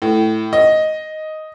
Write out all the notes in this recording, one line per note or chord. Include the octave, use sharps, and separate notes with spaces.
A2
D#5